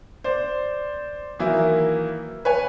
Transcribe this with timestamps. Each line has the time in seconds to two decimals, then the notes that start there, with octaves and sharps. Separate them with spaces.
0.24 C5 D5
1.39 D#3 E3 F#3 A#3 E4
2.45 B4 C#5 G#5